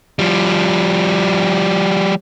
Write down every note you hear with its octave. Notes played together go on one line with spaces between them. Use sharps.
F3 G3